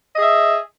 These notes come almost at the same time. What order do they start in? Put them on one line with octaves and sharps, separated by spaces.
D#5 G#4 E5